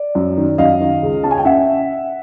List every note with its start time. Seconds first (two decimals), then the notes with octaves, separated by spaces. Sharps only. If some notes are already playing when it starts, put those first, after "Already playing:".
Already playing: D5
0.15 F#2
0.37 D#3
0.58 F#2 D#5 F5
0.80 D#3
1.03 C#2
1.23 C#4 A5
1.31 G#5
1.38 G5
1.45 C#4 E5 F#5